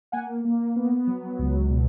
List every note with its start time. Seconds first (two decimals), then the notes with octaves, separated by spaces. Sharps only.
0.12 A#3 F#5 G#5
0.45 A#3
0.76 B3
1.07 F#3
1.39 C#2
1.70 B2